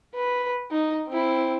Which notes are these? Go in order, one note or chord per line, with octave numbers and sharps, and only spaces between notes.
B4
D#4
C4 E4